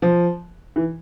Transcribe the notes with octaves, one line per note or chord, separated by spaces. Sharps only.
F3
E3